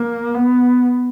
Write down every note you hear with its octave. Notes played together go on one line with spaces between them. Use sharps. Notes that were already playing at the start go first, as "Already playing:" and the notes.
Already playing: A#3
B3